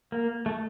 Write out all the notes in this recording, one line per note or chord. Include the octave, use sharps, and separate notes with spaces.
A#3
A3